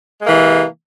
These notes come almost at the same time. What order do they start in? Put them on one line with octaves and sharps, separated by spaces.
G#3 A#3 E3 C3